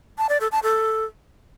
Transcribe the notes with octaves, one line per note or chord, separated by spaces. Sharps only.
A5
D5
A4
A5
A4